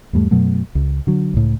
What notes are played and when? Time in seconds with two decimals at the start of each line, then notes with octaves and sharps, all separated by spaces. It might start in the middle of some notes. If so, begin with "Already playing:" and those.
0.13 E2 G#2 G3 A3
0.31 F#2 B2 F#3 A3
0.75 C#2
1.07 D3 F#3
1.34 C#2 A2